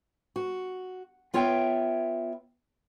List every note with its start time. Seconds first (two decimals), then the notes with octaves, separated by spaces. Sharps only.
0.36 F#4
1.34 B3 F4 C#5 E5 G5